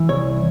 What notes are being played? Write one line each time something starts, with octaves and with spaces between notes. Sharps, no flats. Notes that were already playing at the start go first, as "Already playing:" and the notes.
Already playing: E3
C2 C#5